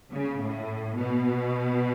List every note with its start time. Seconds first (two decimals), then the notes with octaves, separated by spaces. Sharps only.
0.11 C#3
0.40 A2
0.97 B2